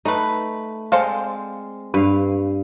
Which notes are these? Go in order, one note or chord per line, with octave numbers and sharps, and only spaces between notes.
A3 D#4 B4
G#3 C4 A4 C5 D5 F5
G2 B4 F5